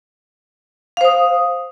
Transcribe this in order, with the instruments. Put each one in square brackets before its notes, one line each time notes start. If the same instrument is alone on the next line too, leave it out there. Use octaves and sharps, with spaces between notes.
[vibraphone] F5
C5
D#6